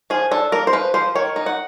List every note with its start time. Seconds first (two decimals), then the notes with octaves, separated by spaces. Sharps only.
0.10 F3 G#4
0.31 D4 A4
0.52 A#3 A#4
0.67 C5
0.73 F3 B4
0.94 F3 C5
1.15 D#3 C#5
1.36 D#4
1.46 F#5